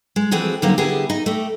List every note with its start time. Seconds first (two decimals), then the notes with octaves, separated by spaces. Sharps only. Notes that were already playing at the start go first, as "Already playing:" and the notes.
0.16 G#3
0.31 E3 F3 C4 F#4 G#4 A4
0.62 D3 F#3 G3 A#3 C4 D#4
0.78 D3 B3 E4 G4 G#4
1.10 D#4
1.26 A3 G4